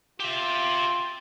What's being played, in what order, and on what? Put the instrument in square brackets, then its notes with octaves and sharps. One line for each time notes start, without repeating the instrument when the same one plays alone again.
[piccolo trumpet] F4 [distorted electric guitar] G4 E5